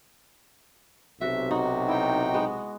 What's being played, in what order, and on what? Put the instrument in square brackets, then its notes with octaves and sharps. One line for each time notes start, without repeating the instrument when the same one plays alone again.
[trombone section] B1 C3 [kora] F#4 [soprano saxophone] E5
[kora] D#4 [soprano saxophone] F#4
[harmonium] D#4 G5 [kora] E4
[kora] G#3 B3